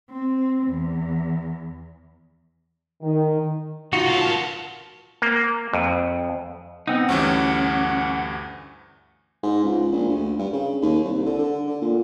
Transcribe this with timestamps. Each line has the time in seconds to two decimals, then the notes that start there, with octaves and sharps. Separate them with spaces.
0.10 C4
0.67 E2
3.03 D#3
3.93 D#4 F4 F#4
4.05 D3 F5
4.21 A#4 A5
5.22 A#3
5.73 F2
6.87 B3 C4 D#4 F#5
7.09 D2 G2 E3 C#4
9.43 G#2
9.64 C#2
9.92 A#1
10.09 D2
10.38 G2
10.53 C#3
10.82 D#2
11.04 C2
11.26 D3
11.39 D3
11.67 D3
11.82 A#2